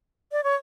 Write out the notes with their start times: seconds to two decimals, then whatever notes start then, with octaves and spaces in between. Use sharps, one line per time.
0.32 D5
0.44 C#5